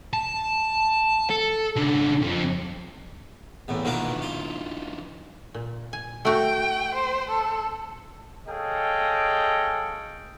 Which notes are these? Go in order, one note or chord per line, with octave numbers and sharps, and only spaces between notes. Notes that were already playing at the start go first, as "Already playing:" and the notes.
A5
A4
C#3 D4
F2
A1 E2 A2
B2 D#3 F3 A#3 D4
F4
A#2
G#5
A3 F#4 G5
C5
A4
G#4 A4 C#5 D#5 F5 G5